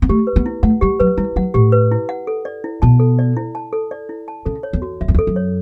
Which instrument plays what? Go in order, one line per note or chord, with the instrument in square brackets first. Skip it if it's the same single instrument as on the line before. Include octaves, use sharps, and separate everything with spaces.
[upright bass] B3
[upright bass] A3 [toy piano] G4
[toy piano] B4
[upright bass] B3
[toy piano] E4
[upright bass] A3 [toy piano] F#5
[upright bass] G3 [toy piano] G4
[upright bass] F#3 [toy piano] B4
[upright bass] G3 [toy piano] E4
[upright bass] F#3 [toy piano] F#5
[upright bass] A2 [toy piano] G4
[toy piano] B4
E4
F#5
A4
D5
E4
[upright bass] B2 [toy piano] A5
[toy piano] A4
D5
E4
A5
A4
D5
E4
A5
[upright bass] C#3 [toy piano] A4
[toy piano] C#5
[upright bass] E2
[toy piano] F#4
[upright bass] E2 [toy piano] E5
[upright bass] F#2
E2
[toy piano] A4
[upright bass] F#2
[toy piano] C#5